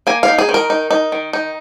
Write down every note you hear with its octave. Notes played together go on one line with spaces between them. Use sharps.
A#3 G#5
F5
D#4
G#4
D#3
A#4
D#4
D#4
D#3
D#4